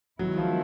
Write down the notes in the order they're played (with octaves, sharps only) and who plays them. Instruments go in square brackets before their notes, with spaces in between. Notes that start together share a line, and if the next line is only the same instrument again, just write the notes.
[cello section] D#3 G#3 B3 E4 [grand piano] F#3
[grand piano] F3